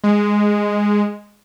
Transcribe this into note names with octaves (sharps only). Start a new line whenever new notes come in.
G#3